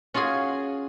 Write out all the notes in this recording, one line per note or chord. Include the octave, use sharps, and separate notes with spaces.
C#4 F4 F#4 G#4 G#5